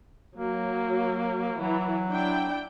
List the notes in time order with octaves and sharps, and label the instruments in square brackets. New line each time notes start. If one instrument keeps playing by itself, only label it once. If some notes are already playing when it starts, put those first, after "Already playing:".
[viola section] F#3 [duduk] A#3
[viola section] E3 [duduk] F#3
[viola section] D4 E4 G5